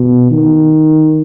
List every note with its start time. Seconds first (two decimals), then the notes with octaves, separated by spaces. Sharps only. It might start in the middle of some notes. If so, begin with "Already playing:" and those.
Already playing: B2
0.31 D#3